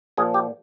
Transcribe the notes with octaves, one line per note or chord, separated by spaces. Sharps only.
A#2 F3 G#4
G4